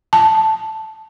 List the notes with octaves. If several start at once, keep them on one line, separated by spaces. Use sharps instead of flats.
A5